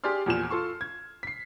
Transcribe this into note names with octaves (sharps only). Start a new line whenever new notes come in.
G4 G#4 D5 C6 F6
E2 A#2 F3 G#5 E7
F4 A4 C6 C#6
G#6
B6 C7